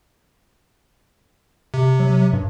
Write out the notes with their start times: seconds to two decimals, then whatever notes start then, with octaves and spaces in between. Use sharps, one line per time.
1.74 C3
2.00 F#3
2.33 G2